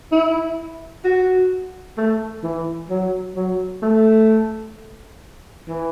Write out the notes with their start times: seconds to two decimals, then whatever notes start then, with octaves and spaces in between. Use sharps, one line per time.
0.12 E4
1.04 F#4
1.98 A3
2.44 E3
2.90 F#3
3.36 F#3
3.82 A3
5.68 E3